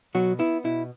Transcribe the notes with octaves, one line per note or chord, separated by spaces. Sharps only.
B2 F#3 F#4
B3 E4
B2 E4